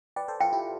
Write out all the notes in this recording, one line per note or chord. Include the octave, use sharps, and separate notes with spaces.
B4 D5 G5
A4 C5
F4 A4 G5
E4 G4